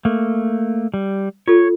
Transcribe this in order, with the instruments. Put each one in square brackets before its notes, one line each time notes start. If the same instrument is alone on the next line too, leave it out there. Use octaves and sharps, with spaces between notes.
[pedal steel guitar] A3 A#3
G3
[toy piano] F4 A4 [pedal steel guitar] C#5